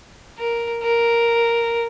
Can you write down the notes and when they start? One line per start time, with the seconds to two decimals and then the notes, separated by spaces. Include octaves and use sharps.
0.38 A#4
0.83 A#4